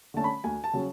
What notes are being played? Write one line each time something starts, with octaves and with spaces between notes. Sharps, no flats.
D3 A3 C#4 A5
B5
D2 G#5
A5
C#3 F#3 C#4